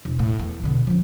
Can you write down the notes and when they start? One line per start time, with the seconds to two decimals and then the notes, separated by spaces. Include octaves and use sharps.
0.05 E1
0.19 A2
0.40 E2
0.64 B2 D3
0.87 F3 C#4